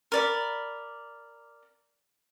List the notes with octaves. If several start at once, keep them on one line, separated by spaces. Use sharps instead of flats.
A#4 D5 B5